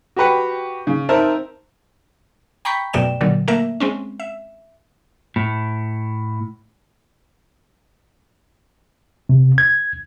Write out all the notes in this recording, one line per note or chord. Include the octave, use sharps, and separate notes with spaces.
F#4 G4 B4 F#5 G5
C#3
C4 D#4 A#4 E5 A5
G5 A#5 B5 C#6 G6 B6
F#2 B2 A3 D5 G5 E7
A#2 D3 F#3
A3 A#3 A#4 E5
G#3 C4 C#4
E5
A2
C3
G#6